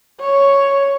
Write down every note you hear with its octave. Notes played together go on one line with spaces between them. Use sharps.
C#5